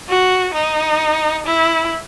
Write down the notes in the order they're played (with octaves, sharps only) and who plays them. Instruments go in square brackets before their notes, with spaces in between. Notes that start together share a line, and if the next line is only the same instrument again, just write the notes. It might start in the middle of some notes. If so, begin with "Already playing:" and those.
[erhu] F#4
D#4
E4